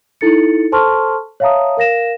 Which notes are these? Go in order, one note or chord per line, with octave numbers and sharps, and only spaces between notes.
D#4 E4 A4 A6 C#7
A4 C5 A5 C6 C#6 F6
C#5 E5 F5 A5 A#5 D#6
A#4 F5 A#6 E7